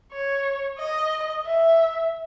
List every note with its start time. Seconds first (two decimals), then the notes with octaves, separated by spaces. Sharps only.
0.12 C#5
0.78 D#5
1.46 E5